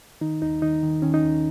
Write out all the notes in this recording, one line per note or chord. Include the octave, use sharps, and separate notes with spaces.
D#3 D#4
D#2 D#4
D#3 D#4
D#3
D#3 C#4
D#4
D#2